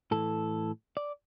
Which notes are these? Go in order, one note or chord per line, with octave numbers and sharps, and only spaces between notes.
A2 E3 A4
D5